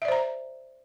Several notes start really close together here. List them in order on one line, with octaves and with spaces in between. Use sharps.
E5 D5 C5 A#5